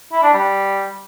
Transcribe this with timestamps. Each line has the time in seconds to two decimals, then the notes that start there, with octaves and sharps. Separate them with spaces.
0.13 E4
0.23 D4
0.34 G3